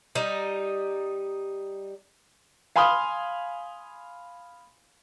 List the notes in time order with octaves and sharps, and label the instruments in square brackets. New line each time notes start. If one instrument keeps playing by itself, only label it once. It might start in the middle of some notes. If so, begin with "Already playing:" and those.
[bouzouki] G3 D#4
[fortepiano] F5 G#5 B5 C6 D#6 F6